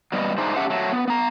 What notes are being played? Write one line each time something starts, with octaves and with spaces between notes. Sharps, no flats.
F#3 G3 B3 D#5
A3 D4 D#4 G#4 C5
C#4 G4 A4 E5 F#5
F#3 A3
B3
B3 A#5